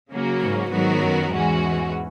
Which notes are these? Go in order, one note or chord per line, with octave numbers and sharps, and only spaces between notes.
C#3 F#3 A#3 C#4 F#4
G#2
G#2 D#3 F#3 B3 F#4 A#4
F#2
E2 G#2 E3 G#3 C#4 F#4